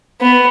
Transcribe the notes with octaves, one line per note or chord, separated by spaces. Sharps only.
B3